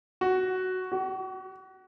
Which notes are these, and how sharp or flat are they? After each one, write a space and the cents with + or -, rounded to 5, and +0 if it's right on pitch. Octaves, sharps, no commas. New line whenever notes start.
F#4 +5
F#4 +40